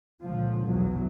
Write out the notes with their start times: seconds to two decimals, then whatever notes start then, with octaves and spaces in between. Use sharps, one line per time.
0.22 C#2 A#2 D3 F3
0.65 B1 E2 F#3